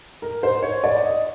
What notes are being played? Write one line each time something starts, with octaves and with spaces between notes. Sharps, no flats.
A#4
C5
C#5
D5
D#5